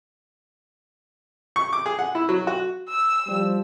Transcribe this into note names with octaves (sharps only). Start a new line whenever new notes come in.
C#6
D6
G#4
F#5
E4
F#3
F#4
E6
F3 G3